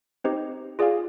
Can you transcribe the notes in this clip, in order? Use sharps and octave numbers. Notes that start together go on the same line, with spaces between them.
C4 D#4 G4 C5 D#5
F4 G#4 D5 F5 G#5